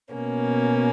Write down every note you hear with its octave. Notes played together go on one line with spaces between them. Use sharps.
B2 A#3 C#4